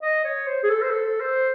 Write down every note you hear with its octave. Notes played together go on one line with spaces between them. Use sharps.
D#5
C#5
C5
G#4
A4
C5
A4
C5